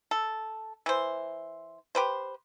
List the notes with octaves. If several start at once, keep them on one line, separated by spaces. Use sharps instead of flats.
A4
E3 C5
G4 B4 C5